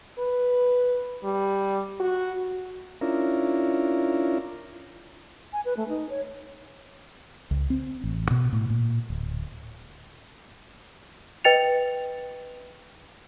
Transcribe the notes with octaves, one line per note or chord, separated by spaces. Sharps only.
B4
G3
F#4
C#4 D4 E4 F4 A#4
G#5
B4
A3
D#4
C#5
C#2
C4
A1
B2
A2
A#2
D1
B4 D#5 G5 A6 C#7 F7